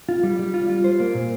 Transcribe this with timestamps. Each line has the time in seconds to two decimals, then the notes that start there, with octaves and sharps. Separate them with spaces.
0.09 F4
0.23 G3
0.39 G3
0.54 F4
0.69 F4
0.84 C5
1.00 A#3
1.15 A#2